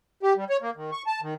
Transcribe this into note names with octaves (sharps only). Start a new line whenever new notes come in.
G4
G3
C#5
A#3
D#3
C#6
A5
D#3